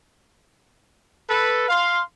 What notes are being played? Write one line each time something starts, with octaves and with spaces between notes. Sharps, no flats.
A4 B4
F5 C6